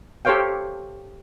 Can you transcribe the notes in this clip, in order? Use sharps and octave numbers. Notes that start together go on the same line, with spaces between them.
G4 A4 C5 C#5 F5 G5